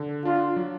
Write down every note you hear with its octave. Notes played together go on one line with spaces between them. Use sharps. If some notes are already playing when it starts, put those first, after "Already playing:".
Already playing: D3
D4 F4
F#3